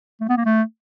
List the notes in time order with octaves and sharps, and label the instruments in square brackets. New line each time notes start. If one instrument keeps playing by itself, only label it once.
[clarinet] A3
B3
A#3
A3